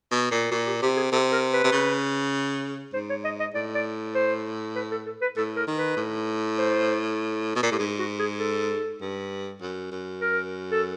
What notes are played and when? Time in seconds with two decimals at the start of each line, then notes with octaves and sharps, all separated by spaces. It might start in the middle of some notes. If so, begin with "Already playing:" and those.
0.11 B2
0.31 A#2
0.51 A#2 F#4
0.66 G4
0.82 C3 G4
0.97 G#4
1.12 C3 A4
1.32 A#4
1.53 B4
1.64 C3
1.72 C#3
2.93 G#2 C5
3.10 C#5
3.24 D#5
3.40 D#5
3.54 A2 D5
3.75 D5
4.15 C5
4.76 B4
4.91 A4
5.06 A4
5.21 B4
5.36 A2 A4
5.56 A#4
5.67 D#3
5.77 B4
5.97 A2
6.58 C5
7.56 B2
7.63 A#2
7.71 A2 G4
7.79 G#2 G#4
7.99 F#4
8.19 G#4
8.39 A4
9.01 G2
9.61 F#2
9.92 F#2
10.21 A#4
10.71 A4